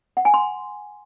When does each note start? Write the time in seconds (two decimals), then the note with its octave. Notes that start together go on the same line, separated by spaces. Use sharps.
0.17 F#5
0.25 G#5
0.34 C6